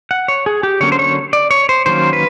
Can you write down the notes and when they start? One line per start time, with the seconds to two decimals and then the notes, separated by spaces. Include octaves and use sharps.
0.11 F#5
0.28 C#5
0.46 G#4
0.63 G4
0.81 D3 F#3 A#3 C#4 C#5
0.92 C5
0.99 C#5
1.33 D5
1.51 C#5
1.69 C5
1.86 D#3 F#3 A#3 C#4 C5
2.13 B4